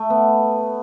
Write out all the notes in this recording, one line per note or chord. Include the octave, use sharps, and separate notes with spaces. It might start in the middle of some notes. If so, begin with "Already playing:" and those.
Already playing: A3
B3